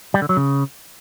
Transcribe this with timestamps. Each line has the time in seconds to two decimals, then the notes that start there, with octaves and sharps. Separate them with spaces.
0.14 G3
0.22 D3
0.29 F#3
0.37 C#3